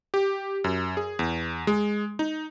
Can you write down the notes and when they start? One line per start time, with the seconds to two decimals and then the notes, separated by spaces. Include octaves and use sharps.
0.14 G4
0.64 F#2
0.97 G#4
1.19 E2
1.67 G#3
2.19 D#4